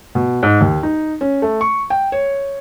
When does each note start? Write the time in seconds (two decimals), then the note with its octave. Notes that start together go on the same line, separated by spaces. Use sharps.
0.15 B2
0.43 G#2
0.61 D#2
0.83 D#4
1.21 C#4
1.42 A3
1.61 C#6
1.90 G5
2.12 C#5